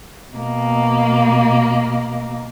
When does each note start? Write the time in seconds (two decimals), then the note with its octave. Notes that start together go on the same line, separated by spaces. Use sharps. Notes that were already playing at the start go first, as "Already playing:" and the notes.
0.33 B2 A#3